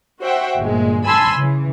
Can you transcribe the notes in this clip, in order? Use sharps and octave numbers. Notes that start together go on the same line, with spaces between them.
F#4 C5 E5 F#5 G5
G1 A#2 G#3
G#5 A5 B5 C6 E6
C#3 E3